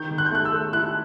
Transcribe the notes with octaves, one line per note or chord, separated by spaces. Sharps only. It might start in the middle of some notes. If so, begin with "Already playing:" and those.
Already playing: D#3 G6
D#3
F#6
G6
A3 F#6
E6
A3
E4 F#6